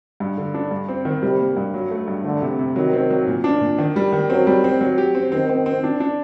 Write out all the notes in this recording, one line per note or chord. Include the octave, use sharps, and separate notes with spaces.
G2
D3
D4
G2
C4
D#3
C3 G3
A#3
G2
F#3
A3
G2
D3 A3
C3
C3
D#3 F#3
C4
F#3
A#2
D4
A#2
D#3
G3
D#3
F#3 C4
G3
C4
F#3
G4
C4
D#3 C4
C4
C4
D4
D4